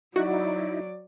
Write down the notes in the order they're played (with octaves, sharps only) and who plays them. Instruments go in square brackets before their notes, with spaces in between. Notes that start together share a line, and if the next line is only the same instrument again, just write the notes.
[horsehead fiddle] F#3 D5 [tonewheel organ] D#4 E4 [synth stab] F#4